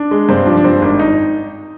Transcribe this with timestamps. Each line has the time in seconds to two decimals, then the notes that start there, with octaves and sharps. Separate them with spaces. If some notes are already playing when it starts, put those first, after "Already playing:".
Already playing: D4
0.11 G#3
0.29 G2 C4
0.46 F3 D4
0.57 D4
0.64 G2 C4
0.82 G#1 D4
0.99 D#4